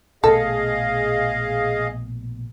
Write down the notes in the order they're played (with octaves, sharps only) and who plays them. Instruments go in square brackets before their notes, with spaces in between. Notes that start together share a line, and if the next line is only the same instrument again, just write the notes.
[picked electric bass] A#1 B2 A3 [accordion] G#4 D#5 F5 [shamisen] A4